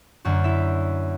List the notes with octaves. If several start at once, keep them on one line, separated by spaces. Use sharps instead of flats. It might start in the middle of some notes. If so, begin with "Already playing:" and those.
F#2 D3 A#3 F#4 F#5
E4 E5